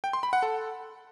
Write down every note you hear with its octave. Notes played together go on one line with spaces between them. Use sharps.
G5
C6
B5
F#5
A4